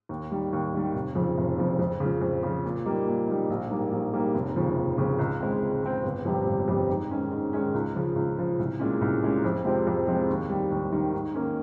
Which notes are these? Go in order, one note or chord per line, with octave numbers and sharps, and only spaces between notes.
D#2
D#3 G3
D#2
D#3 G3
F1
F2 C#3 F3
F1
F2 C#3 F3
F2
C#3
F3
F2
C#3 F3
A#2
G3 A#3 D#4
A#2
G3 A#3 D#4
A#1
G#2 G3 A#3
A#1
G#2 G3 A#3
F1
D#2 C#3 F3
F1
D#2 C#3 F3
C#2
C#3 G#3 C4
C#2
C#3 G#3 C4
G1
F2 C3 G3
G1
F2 C3 G3
G#2
D#3 G#3 C#4
G#2
D#3 G#3 C#4
C#2
C#3 F3
C#2
C#3 F3
C2
A#2 G#3 C#4
C2
A#2 G#3 C#4
F2
C3 F3 G#3 C4
F2
C3 F3 G#3 C4
D#2
D#3 G3
D#2
D#3 G3
G#2
D#3 A#3 C#4